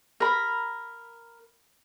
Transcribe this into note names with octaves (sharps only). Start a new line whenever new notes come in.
A#4 B5